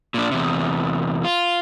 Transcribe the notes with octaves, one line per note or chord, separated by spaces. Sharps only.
A#2 D4
E2 C3
F4